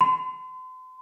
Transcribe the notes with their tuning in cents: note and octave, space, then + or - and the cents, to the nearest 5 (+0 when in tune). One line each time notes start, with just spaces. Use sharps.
C6 -40